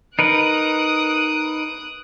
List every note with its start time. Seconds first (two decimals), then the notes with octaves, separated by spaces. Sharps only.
0.19 D#4 A#4 B4 D#6 F#6 D7